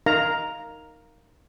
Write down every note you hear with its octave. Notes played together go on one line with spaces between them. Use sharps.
D#4 A#4 F5 A#5